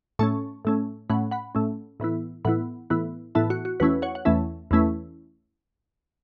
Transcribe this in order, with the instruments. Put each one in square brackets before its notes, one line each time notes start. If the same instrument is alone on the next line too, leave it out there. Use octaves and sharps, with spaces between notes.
[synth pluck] A2 A3 C#4 A5 C#6
A2 A3 C#4
A2 A3 C#4 F#5 B5
F#5 B5
A2 A3 C#4
A2 E3 B3 E4
A2 E3 B3 E4 F#5 B5
A2 E3 B3 E4
A2 E3 B3 E4 E5 A5
F#4
F#4
E2 E3 A3 C#4 E4 F#4 B4
C#5 F#5
F#5
E2 E3 A3 C#4 E4 E5 A5
E2 E3 A3 C#4 E4